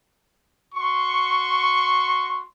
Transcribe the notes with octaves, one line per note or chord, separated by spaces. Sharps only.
F#4 C6 C#6